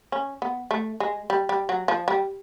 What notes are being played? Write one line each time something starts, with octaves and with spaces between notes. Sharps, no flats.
C#4
B3
A3
G#3
G3
G3
F#3
F3
G3